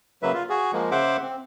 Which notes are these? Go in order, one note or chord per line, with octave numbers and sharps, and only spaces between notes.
C#3 F#3 A#3 B4 E5
F4
F#4 G#4
F3 G#3 A#3
C#3 C5 E5 F#5 D6
C4